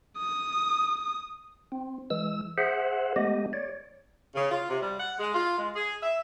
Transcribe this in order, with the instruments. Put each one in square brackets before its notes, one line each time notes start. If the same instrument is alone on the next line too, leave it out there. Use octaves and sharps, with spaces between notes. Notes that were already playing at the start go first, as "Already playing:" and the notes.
[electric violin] D#6
[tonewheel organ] C4
E3 G#3 E6
G#4 C5 E5 F#5
G#3 A3 B3 G4 D#5
C#5 D5
[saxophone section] C#3
F4
C3
G3
F#5
G#3
F4
G#3
G#4
E5